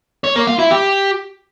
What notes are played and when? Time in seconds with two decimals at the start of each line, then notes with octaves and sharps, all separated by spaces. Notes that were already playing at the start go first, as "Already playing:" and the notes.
0.24 C#5
0.36 A#3
0.47 F4
0.59 E4
0.71 G4